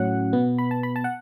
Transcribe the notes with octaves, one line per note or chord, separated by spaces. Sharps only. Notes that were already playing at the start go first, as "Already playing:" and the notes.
Already playing: A2 F#3 C#4 F#5
B2 B3
B5
A5
B5
A5
F#5